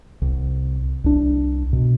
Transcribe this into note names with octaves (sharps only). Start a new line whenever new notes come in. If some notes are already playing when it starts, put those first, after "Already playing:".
C2
C2 D4
B2